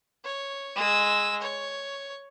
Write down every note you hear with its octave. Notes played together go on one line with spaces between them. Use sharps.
C#5
G#3 E6
C#5